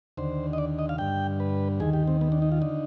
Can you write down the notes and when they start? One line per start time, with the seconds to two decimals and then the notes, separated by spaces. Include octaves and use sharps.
0.17 D#2 D3 C5
0.53 D#5
0.58 D5
0.79 D#5
0.89 F5
0.98 G2 D3 G5
1.40 B4
1.80 D#2 D#3 G#4
1.93 G4
2.07 C4
2.21 B3
2.32 D4
2.42 D#4
2.52 F4
2.62 D3 D#4